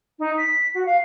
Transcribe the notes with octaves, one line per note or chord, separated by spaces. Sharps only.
D#4
B6
F#4
F5